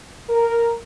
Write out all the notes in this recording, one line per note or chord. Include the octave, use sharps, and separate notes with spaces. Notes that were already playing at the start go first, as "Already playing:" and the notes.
A#4